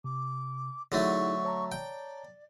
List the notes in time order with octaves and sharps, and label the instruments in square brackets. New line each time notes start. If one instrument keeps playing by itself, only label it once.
[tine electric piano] C3 [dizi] D6
[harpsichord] D3 F#3 A3 [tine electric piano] D#4 E4 G#4 [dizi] C#6
[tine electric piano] C#5 A5 A#5
[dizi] D5 [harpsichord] G5